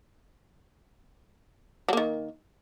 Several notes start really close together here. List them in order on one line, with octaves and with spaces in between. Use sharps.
F#3 A#3 D#3